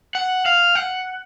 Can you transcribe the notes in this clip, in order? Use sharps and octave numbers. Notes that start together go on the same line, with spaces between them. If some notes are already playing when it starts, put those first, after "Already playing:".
F#5
F5
F#5